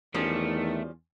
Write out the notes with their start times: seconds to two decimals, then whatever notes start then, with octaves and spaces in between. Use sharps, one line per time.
0.14 E2 D#3 F3 G3 A3 C#4